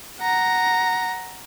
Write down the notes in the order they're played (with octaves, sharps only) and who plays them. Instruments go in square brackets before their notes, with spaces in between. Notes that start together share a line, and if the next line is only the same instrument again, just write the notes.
[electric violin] F#5 A#5